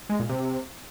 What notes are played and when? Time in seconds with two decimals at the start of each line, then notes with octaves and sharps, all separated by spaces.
0.09 G#3
0.19 A#2
0.29 C3